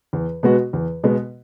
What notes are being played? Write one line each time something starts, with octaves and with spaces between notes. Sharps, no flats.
E2
B2 G#3 B3 F#4
E2
B2 G#3 B3 F#4